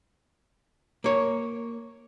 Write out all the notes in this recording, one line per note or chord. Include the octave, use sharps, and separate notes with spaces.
A#3 C#5